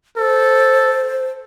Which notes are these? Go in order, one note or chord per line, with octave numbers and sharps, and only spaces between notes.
A4 C5